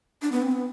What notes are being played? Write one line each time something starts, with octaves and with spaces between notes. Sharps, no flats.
D4
B3
C4
B3